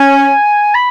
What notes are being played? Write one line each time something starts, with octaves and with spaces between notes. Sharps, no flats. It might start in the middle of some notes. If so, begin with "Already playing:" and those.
Already playing: C#4 G#5
B5